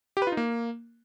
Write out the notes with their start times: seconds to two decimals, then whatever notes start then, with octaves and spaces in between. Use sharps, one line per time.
0.17 G4
0.22 B4
0.27 F4
0.32 D#4
0.37 A#3